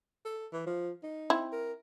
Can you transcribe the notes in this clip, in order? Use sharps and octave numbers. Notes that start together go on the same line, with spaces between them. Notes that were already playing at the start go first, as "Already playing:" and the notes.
A4
E3
F3
D#4
C4 E4
A#4